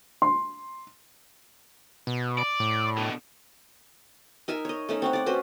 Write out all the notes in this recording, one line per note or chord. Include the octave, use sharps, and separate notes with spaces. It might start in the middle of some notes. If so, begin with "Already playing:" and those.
C6
B2
D5
A2
B2 D3
D#4 A#4 E5 G#5
C#5 D#5
A3 C#4 D#4
C4 C#5 F#5
D5 F#5
C#4 F#4 B4 C5